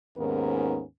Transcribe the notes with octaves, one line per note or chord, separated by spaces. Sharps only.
D#2 G#2 B3 C#4 A#4